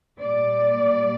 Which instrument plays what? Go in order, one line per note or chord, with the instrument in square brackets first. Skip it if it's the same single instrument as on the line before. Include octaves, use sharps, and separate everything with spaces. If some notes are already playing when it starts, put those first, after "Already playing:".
[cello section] A#2 G3 D5